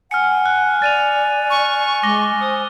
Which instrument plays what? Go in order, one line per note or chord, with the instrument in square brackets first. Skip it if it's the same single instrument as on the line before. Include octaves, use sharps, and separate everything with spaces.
[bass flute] F#5 [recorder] G#5 [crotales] F6 C#7
[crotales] F#6
[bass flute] D5 [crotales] A6 D#7 F7
[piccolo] C#6
[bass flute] G#3 [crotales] D6 A#6 G7
[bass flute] C5 [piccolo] D#6